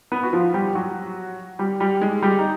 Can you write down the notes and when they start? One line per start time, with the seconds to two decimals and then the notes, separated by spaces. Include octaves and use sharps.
0.12 B3 B4
0.23 F#4
0.33 F3 F4
0.54 G3 G4
0.75 F#3 F#4
1.59 G3 G4
1.80 G3 G4
2.01 G#3 G#4
2.22 G3 G4
2.39 D#4